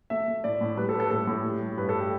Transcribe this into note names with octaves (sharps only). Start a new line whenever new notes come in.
A3 E5
A3
A2 D5
A2
G3 B4
A4
G3 B4
A4
A2 A4
A2
G3
G3
G2 B4
A4
G4